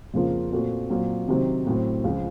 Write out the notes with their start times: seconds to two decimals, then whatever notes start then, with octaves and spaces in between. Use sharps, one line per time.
0.14 F2 C#3 F3 A#3 F4
0.52 A#2 A3 C4 F#4
0.90 A#2 F#3 C4
1.28 C3 D#3 F#3 C4
1.66 A2 F#3 C4
2.04 C#2 C#3 F3